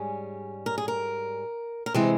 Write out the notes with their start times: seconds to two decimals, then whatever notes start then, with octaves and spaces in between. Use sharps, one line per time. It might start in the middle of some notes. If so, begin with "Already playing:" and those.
Already playing: G#2 G3 C#4 G#4
0.66 A#4
0.78 G#4
0.88 A#4
1.86 A#4
1.94 C3 E3 G#3 C4 C5